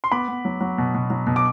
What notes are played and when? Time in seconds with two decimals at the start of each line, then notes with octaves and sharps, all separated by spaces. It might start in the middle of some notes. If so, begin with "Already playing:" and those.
0.04 C6
0.12 B3 B5 D6
0.28 B3
0.45 F#3
0.61 F#3
0.78 B2
0.94 B2
1.10 F#3
1.27 B2
1.36 D6